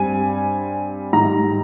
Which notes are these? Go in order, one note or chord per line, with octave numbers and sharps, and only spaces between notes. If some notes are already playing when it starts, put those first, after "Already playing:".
Already playing: G2 G3 C4 G#5
G#2 D#3 G3 A#5